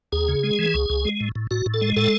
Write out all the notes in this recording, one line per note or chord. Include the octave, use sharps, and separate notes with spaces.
D#2 G#4
C#3
G#3
E3
C#2
C#2
G#3
A2
A2
A2 F#4
A2
A4
G#3
A2 A4